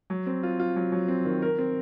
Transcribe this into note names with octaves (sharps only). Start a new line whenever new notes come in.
F#3
C4
F4
F4
F#3
F#3
C4
D#3
A#4
C4